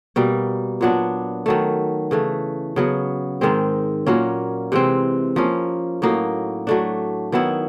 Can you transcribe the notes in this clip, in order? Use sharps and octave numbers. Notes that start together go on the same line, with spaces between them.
B2 G3 A#3
A#2 F#3 B3 D4
D#3 F#3 A3
C#3 E3 A3
C#3 F#3 B3
G#2 D#3 G#3 C4
A#2 F#3 A#3 C#4
C3 E3 G#3 C4
F3 A#3 C#4
A2 F#3 A#3 D#4
F#3 A3 D4
D#3 F#3 B3 E4